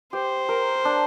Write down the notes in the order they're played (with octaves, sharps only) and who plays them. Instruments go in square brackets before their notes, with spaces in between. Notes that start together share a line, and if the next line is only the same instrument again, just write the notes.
[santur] G4 [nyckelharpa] C5
[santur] A#4
D4